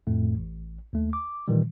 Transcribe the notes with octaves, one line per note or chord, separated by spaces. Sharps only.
F2 A2 A3
A1
D#2 A3
D6
A#2 D#3 E3 G3